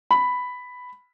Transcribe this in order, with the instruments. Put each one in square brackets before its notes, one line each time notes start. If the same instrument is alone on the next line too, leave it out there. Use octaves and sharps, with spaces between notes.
[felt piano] B5